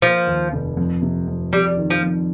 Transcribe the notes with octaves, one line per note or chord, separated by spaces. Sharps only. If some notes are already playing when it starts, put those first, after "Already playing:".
F3 A#3
D#2
F1
F2
C3
F2
F2 G3
D#3
F3
F2